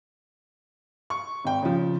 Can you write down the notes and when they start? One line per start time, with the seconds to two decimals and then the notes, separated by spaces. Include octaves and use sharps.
1.10 C#6
1.44 G#1 G5
1.63 C#3 F3